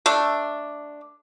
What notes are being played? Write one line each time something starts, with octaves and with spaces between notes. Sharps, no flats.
A3 D4